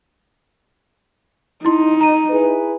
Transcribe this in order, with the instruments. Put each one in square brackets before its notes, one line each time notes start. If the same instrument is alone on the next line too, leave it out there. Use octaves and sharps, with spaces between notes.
[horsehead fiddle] D#4 [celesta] E4 C6
[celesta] A#5 D#7
[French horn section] E4 G#4 B4